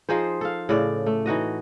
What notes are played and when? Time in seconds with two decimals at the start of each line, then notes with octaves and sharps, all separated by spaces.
0.09 F3 D#4 G#4 C5
0.41 A4 F5
0.69 A2 C#3 D5
1.07 A3
1.26 E3 D#4 F#4 D#5